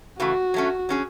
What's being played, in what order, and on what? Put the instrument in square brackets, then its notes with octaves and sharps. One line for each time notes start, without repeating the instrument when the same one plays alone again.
[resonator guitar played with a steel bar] C#3 E3 A3 [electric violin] F#4
[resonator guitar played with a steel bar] F#3 A3 C#4
F#3 C#4 G#4